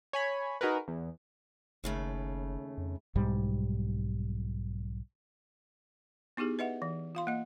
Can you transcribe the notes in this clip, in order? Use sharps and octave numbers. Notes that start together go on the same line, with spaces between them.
C#5 G#5 B5
D#4 F#4 G#4 A#4 B4
E2
F#1 D#2 C#3 A3
F2
B1 G#2 G3
B3 D#4 E4 G4 G#4
B4 D#5 E5 F#5
E3
F4 F5 C6
A#3 D#5